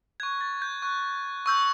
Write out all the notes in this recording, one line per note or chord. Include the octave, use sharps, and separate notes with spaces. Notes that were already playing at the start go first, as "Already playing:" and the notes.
C#6 F#6 G#6
A6
G6
C#6 F#6
C#6 E6 G6